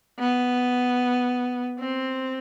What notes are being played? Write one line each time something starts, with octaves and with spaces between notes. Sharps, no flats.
B3
C4